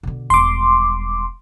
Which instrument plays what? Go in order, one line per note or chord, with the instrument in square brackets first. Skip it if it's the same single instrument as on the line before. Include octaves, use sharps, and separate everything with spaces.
[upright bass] B2 D3
[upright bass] E1 G3 [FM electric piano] C6 D6